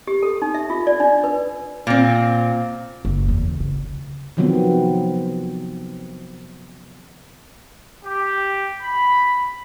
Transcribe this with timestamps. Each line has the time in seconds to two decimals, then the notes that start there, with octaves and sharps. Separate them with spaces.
0.07 G4
0.23 A4
0.42 D#4
0.54 E5
0.70 F4
0.87 D5
1.00 D4
1.24 B4
1.87 A#2 C4
3.05 F#1
3.28 E2
3.60 C#3
4.37 C3 D#3 F3 F#3 B3 C4
8.04 G4
8.82 B5